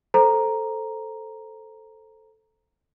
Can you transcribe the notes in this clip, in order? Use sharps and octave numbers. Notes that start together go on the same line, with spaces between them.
A4 C5 A#5